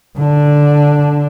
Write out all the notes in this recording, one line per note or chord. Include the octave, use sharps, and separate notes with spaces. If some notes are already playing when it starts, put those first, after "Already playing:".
D3 D4